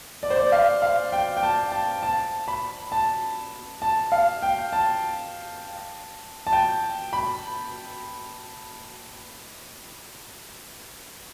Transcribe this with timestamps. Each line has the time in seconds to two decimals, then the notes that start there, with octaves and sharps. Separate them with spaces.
0.23 D5
0.30 C5
0.37 D5
0.52 F5
0.82 F5
1.12 G5
1.37 G5
1.43 A5
1.72 A5
2.03 A5
2.48 B5
2.92 A5
3.82 A5
4.12 F5
4.42 G5
4.73 A5
6.47 A5
6.53 G5
7.13 B5